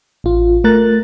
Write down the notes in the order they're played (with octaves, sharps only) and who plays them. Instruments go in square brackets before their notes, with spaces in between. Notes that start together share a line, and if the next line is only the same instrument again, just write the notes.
[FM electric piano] A1 F4
A3 A#4 A#5 F#6 A6